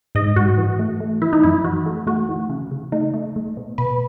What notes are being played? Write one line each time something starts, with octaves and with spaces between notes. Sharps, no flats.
G#2 D#5
G#2 F#4
E3
A3
A3
E3 E4
D#4
F#2 E4
E3 F#4
A3
A3 F#4
E3
C#3
C#3
A3 D#4
A3
A3
B2
B2 B4